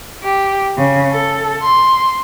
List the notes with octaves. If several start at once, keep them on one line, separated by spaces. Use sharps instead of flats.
G4
C#3
A4
C6